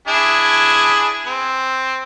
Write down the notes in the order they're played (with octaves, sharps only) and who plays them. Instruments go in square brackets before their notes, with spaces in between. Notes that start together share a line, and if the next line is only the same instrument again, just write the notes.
[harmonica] D4 E4 G#4
C4